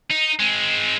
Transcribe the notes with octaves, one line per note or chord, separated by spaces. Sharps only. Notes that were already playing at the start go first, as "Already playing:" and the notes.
D#4
G#3 C4